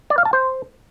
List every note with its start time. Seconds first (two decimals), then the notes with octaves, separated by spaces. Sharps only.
0.10 D5
0.18 F5
0.25 A5
0.33 C5